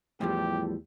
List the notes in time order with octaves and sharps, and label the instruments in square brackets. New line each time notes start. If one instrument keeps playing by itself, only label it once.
[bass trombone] E2 [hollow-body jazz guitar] A2 F3 G3 [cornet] G4